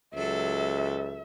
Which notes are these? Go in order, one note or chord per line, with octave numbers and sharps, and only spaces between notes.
C#2 F#3 A4 E5